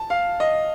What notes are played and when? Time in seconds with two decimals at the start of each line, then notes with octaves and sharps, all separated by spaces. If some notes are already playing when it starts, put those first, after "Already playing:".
Already playing: A5
0.10 F5
0.40 D#5